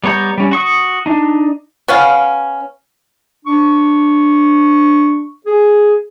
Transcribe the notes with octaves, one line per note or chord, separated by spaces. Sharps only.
G3 B3 C#5 A#5 G6
G3 C#4
F#4 C#6 D#6
D4 D#4
B3 C#4 F5
D4 C#6
G#4